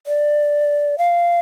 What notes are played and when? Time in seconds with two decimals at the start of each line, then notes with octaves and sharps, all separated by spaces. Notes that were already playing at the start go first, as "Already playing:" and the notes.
0.07 D5
0.98 F5